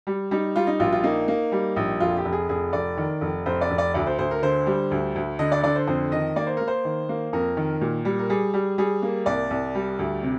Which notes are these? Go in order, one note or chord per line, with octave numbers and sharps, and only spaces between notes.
G3
G3 D#4
G3 F4
D#4
A#1 F4
F4
A#3 D#4
A#3
G3
A#1
F1 F4
G4
F1
G#4
F1 G#4
F1 D5
D#3
F1
F1 C5
D5
F1
D5
D2 D5
C5
D2 C5
A#4
D3 C5
G3
D2
D2
D3 D#5
D5
D3 D5
C5
F2 C5
D#3 D#5
A#3 D5
C5
A#3 A#4
C5
D#3
A#3
F2 A#4
D#3
A#2
G3
A#4
G3 G#4
G3
G3 G#4
A#3
C2 D5
C2
G3
D2
C3